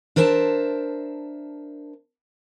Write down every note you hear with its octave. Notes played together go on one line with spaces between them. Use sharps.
D4 A#4 C5 E5 G5 A5